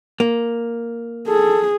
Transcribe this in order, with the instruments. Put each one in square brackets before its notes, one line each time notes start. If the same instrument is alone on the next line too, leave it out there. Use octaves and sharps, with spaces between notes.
[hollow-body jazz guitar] A#3
[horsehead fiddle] G#4 [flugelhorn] A4